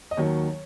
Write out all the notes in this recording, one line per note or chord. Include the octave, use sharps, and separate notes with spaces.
D#5
D#2 D#3 F#3 C#5